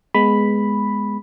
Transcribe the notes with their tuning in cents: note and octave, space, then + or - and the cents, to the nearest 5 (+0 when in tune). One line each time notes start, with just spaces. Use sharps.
G#3 +0 B3 +0 B5 +0